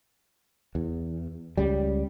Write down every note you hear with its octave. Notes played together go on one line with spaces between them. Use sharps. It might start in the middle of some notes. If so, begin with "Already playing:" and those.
E2
C#2 C#3 G3